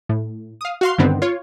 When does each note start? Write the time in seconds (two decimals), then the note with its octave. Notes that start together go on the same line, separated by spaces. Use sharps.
0.09 A2
0.61 F5 D#6
0.81 F#4 F5 C6
0.98 G2 D3 D#3 B3 C4
1.22 F4 C#5